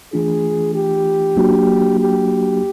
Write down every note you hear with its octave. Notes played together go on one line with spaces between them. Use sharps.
E3 A3 D4 F4 G#4
G4
F#3 A#3 D4 F#4
G4